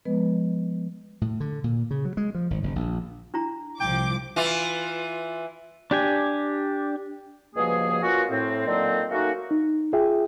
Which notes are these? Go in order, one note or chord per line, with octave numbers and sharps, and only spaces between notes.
F3 G#3 B3 B4 D#5
A2
D3
A#2
C#3
F#3
G#3
F3
G#1
F#1
A#1
D4 E4 A#5
C2 F3 G5 D6
E3 F4
D4 G4 G#5
C#2 G2 B2 F3 A#3 G#4
B2 A#3 C#4 F4 F#4
A2 C4
A#2 D3 D#3 F#3 A#3 C4
A3 A#3 C#4 D#4 F#4
D#4
F4 G#4 E5 G5